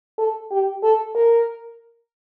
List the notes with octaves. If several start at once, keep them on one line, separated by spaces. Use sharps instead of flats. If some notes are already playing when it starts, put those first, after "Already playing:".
A4
G4
A4
A#4